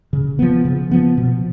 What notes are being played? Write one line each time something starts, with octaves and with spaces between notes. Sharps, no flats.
C#3
F3 B3
C#3
F3 B3
B2